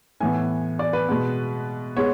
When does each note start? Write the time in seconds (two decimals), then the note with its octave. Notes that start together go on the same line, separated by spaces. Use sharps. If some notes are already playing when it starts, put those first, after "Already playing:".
0.20 A2 E3 B3 G#5
0.79 D5
0.93 B4
1.08 B2 G#3 B3
1.97 G#3 B3 C#5